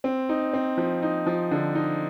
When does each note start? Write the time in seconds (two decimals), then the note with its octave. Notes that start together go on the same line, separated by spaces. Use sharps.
0.04 C4
0.29 D#4
0.53 C4
0.77 F3
1.03 D#4
1.26 F3
1.51 D3
1.75 D#4